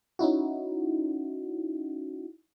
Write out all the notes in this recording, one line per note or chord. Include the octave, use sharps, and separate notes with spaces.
C#4 D#4 E4 F#4